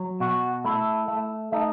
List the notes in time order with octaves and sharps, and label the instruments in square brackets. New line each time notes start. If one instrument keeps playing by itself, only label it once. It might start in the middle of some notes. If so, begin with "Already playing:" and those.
Already playing: [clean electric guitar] F#3
B2 F#4
A3 E4
A3
A3 D#4